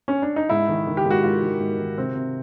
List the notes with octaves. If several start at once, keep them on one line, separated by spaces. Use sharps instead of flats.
C#4
D4
D#4
G#2 E4
D#3
D#3
G4
G#2
F#4
G#2 F4
D#3
G#2
D#3
C3 C4
C3